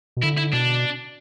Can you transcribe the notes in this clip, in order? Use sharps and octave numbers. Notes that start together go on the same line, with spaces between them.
B2
D3 E4
E4
B2 D4